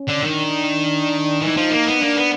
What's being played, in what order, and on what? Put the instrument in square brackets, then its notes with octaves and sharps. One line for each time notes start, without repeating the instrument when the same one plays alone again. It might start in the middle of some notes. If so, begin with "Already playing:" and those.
Already playing: [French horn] C#4
[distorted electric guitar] D3
[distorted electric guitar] D#3 [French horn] D4
[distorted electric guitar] E3 [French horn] D#4
[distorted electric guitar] F3
A#3
B3
[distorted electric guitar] A#3 [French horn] D4
[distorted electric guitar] B3